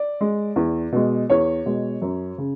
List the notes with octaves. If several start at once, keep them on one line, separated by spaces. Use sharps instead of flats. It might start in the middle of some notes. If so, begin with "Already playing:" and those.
Already playing: D5
G#3
E2
B2 G#3
E2 C#5
B2 G#3
F#2
C#3